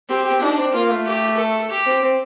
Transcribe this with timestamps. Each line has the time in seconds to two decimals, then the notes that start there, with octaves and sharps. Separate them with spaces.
0.09 C4 G4
0.25 G4
0.41 D4 D#4
0.58 C4
0.73 A#3 F4
0.90 A3
1.06 G4
1.38 A4
1.70 G4
1.86 C4
2.03 C4